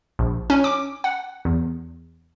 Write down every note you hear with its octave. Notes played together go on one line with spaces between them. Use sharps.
A#1
C#4
D6
F#5
E2